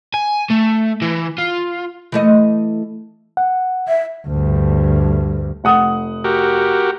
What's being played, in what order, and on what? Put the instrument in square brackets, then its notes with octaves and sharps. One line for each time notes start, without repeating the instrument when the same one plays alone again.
[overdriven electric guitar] G#5
A3
E3
F4
[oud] E3 A3 D#5
[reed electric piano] F#5
[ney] E5
[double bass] D2 G2
[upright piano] F1 F#5 D#6
[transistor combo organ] F#4 G4 A#4